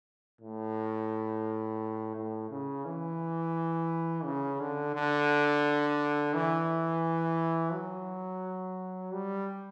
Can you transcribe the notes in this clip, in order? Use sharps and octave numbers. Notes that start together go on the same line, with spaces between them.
A2
A2
C#3
E3
C#3
D3
D3
E3
F#3
G3